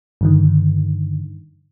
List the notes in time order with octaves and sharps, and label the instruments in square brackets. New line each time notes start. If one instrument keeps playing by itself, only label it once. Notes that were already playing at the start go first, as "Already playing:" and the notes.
[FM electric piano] G2 D3 D#3